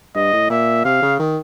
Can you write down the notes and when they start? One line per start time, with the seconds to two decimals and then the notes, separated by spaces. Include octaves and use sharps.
0.15 G2 D#5
0.33 A2
0.50 A#2 E5
0.85 C3 F5
1.02 C#3
1.20 D#3